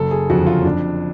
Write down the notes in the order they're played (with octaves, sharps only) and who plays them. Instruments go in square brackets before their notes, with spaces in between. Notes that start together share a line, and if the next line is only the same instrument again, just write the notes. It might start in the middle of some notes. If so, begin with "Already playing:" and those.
Already playing: [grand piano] F#1 A4
G#4
F2 D3 F#4
F4
C#4
F2 D4